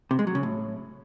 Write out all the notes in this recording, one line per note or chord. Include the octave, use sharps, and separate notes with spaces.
C3
G#3
F#3
C#3
A2